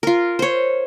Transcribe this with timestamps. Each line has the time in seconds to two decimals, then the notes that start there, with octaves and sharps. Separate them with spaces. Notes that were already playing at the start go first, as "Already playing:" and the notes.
0.03 F4 A#4
0.39 C5 C#5